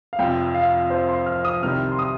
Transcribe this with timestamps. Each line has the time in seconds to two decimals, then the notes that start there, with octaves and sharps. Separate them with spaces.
0.13 F5
0.19 F1 F2 F3 G5
0.54 F5
0.90 C5
1.08 C6
1.26 F6
1.45 D#6
1.62 C2 C3 D#3 G3 C4 F6
1.92 C6
1.99 D#6